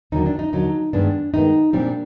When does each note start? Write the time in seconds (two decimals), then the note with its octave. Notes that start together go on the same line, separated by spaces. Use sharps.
0.12 D#2 D3 F#3 D#4
0.26 D4
0.39 D#4
0.52 D#2 D3 F#3 D#4
0.93 G2 D#3 G#3 B3 D4
1.33 G2 D#3 G#3 B3 D#4
1.73 A#2 G3 C4 D4